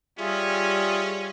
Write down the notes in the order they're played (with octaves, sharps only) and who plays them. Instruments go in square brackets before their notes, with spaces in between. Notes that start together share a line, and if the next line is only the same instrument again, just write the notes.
[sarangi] G3 [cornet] C#4 [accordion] F4 G#4 E5